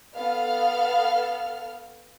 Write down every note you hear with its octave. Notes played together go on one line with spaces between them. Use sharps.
B3 A4 F5 F6